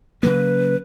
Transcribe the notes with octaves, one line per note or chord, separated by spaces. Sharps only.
C#3 F#3 A#3 B4